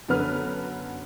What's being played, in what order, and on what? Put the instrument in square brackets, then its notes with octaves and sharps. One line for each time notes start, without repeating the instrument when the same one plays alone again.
[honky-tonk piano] F#2 D3 B3 B4 F6